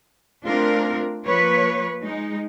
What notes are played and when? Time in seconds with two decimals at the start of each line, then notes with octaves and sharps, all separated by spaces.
0.44 A3 C4 D4 F4 A#4
1.26 F3 A#3 B4 C#5
2.03 G#3 D#4